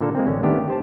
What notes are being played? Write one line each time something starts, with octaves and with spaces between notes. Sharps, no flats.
A#2 D3 A#3 A4
G#3 A#3 C4
A1 D3 C#4
D#3 A3 B3 D4 G4
G4 C5 A5